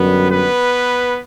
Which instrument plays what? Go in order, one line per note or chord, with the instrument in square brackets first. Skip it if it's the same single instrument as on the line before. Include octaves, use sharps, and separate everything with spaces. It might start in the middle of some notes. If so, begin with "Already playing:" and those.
Already playing: [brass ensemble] F#2 D3 G3 B3 B4
B3 B4